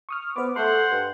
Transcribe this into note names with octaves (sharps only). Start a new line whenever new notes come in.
C#6 D#6 F6
B3 C5 D6
A3 C5 F#5 C6
G2